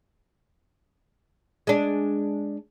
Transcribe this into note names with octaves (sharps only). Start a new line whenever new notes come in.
G#3 D4